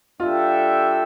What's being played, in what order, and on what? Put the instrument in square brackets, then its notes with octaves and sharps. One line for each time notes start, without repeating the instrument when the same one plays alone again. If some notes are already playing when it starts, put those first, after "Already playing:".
[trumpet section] G3 D4 A4 E5 G5 [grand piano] F4